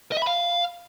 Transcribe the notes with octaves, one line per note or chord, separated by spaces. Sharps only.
D#5
E5
B5
F5